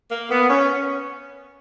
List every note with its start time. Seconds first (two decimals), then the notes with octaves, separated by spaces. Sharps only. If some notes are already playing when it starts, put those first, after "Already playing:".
0.11 A#3
0.30 B3
0.50 C#4